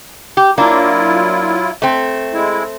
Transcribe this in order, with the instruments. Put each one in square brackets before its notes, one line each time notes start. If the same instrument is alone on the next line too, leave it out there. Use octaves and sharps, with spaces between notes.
[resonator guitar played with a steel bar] G4
[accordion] F#3 E4 F4 [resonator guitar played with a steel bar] A#3 D4
[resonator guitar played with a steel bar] A3 C4
[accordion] G#3 E4